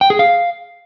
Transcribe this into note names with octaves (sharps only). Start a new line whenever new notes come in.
G5
G#4
F5